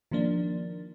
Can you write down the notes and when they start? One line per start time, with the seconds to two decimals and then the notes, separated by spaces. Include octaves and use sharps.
0.11 D#3 F3 A#3 D4